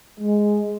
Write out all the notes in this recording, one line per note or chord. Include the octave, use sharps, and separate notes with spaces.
G#3